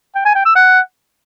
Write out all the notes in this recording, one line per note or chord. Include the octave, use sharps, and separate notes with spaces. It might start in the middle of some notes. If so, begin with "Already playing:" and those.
G5
G#5
G5
E6
F#5